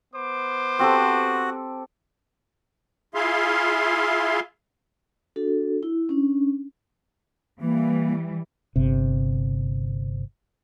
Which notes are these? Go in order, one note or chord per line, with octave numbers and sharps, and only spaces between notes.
B3 C5 D6
C4 F#4 G4 A4
E4 F4 G#4 E5 F5 C6
D4 F#4 A4
E4
C#4 D4
E3 G3 A#3
G1 C3